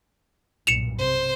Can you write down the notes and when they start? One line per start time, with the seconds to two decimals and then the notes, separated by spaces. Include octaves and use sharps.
0.67 B1 G2 A#2 C#7 E7 F7
0.99 C3 C5